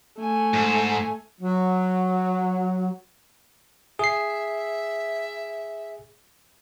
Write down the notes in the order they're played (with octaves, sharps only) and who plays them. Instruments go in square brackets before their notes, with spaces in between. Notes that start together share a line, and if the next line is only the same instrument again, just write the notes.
[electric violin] A3 G#5
[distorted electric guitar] G#2
[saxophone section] F#3
[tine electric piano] G#4 C7 [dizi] E5